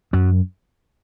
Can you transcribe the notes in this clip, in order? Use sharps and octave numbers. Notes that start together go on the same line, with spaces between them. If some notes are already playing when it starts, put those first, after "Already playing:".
F#2 F#3